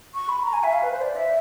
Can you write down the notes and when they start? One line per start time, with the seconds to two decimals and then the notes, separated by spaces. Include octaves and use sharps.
0.14 C#6
0.29 B5
0.43 A#5
0.53 G#5
0.63 E5
0.73 F5
0.83 B4
0.92 C5
1.01 D5
1.16 E5